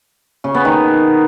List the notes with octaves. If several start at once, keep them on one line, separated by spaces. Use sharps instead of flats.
C#3
B3
D#3